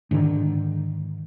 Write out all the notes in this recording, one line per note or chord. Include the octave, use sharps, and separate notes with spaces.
G#2 D3 D#3